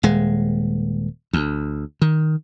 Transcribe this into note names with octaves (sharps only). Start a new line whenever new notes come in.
D#1 G#3
D2
D#3